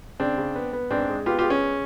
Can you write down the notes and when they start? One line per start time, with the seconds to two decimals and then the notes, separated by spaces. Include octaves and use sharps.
0.20 C#3 C4 D4
0.38 C#3
0.56 B3
0.73 B3
0.90 G#2 C4 D4
1.09 G#3
1.26 B3 F4 G4
1.39 F4 G4
1.44 G#3
1.50 C#4